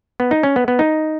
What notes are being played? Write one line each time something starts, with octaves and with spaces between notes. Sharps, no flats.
B3
D#4
C#4
B3
B3
D#4